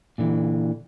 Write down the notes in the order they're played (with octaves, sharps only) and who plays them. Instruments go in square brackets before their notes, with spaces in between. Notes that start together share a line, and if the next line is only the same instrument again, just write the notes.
[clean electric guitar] A#2 D3 E3